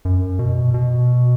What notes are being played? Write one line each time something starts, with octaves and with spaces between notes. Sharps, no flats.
F#2
B2
B2